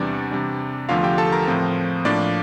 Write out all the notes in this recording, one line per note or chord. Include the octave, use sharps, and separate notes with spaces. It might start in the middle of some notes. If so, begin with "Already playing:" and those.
Already playing: E2 C3 E3 G3 D4 D5
C3 G3 D4
E2 D3 F3 A3 F4 F5
G4 G5
A4 A5
A#4 A#5
A2 F3 C4
A2 F3 A#3 D4 D5